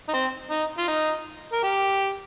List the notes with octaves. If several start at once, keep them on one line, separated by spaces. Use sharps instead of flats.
D#4
C4
D#4
F4
D#4
A#4
G4